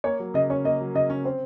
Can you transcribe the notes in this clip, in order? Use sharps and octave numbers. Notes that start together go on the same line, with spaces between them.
A#3 C#5
F#3
C#3 D#5
C#4 C#5
A#3 D#5
F#3
C#3 D#5
C#4
C4 C5